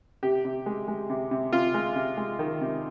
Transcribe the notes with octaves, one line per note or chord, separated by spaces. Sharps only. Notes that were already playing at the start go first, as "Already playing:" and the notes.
C3 G4
C3
G#3
G#3
C3
C3
C3 F4
G#3
C3
G#3
D#3
C3